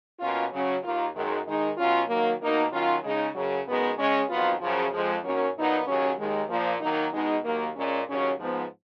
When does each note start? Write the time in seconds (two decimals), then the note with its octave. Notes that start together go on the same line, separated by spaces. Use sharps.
0.20 B2 A#3 C#4 F4
0.51 C#3 F#3 C#4
0.83 D#2 D#3 A#3 F4
1.14 F#2 D#3 G#3
1.46 D#3 G#3 D#4
1.77 B2 F#3 C#4 F4
2.09 D#3 F#3 A#3
2.41 B2 A#3 D#4
2.71 D#3 F#3 C#4 F4
3.03 C#3 G#3 D#4
3.35 F#2 C#3 F#3
3.66 F#2 D#3 G#3 B3
3.98 C#3 G#3 C#4
4.29 F2 D#3 F#3 B3 F4
4.60 F#2 C#3 F3
4.92 F2 F3 G#3
5.24 F#2 D#3 F#3 A#3 C#4
5.55 A#2 F#3 B3 D#4
5.86 D#2 C#3 F#3 C#4
6.18 D#2 D#3 G#3
6.49 A#2 F3 A#3
6.81 D#3 F#3 A#3 D#4
7.12 B2 G#3 D#4
7.44 D#2 D#3 F#3 A#3
7.76 A#2 G#3 C#4
8.06 D#2 C#3 F#3 C#4
8.38 G#2 F3 B3